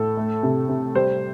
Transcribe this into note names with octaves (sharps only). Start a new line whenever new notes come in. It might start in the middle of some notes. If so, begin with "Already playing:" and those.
Already playing: A2 A4
A3
C3
C3
G3 C5